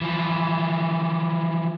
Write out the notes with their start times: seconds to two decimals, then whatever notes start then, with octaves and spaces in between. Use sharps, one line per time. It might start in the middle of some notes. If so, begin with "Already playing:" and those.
0.01 E3 F3